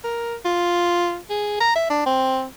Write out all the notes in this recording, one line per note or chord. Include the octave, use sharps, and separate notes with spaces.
A#4
F4
G#4
A#5
E5
D4
C4